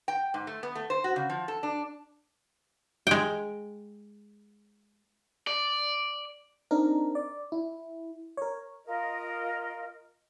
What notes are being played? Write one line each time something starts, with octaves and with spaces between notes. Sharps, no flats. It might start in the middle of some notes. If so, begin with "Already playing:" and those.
G5
G#2
A3
B3
A3
C5
F#4
C#3
F3
A4
D4
G#3 G5
D5
C4 D4 D#4 A#4
D5
E4
A#4 C#5
F4 A#4 D#5